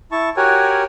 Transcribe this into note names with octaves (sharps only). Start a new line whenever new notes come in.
E4 A5 C#6
F#4 G4 A#4 C#5 F#5 G#5